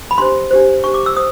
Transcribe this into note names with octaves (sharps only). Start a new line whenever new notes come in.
B5
D4 G4 C5 C6
D4 G4 C5
D4 G4 C5 C#6
D6
E6
C5 D#6